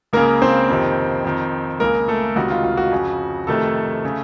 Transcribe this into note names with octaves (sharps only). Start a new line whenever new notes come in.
C#2 C#3 A#3 A#4
C4 C5
F2 C3 D#3
F2 D#3
C#2 C#3 A#3 A#4
A3 A4
C#2 C3 D#3 F#4
F4
F4
F#4
F2 C#3
F2 C3 D#3 A3 A4
C#3